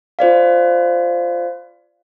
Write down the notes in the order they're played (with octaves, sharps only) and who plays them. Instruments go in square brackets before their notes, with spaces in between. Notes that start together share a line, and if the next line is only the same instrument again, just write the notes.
[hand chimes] F4 C5 D5 F5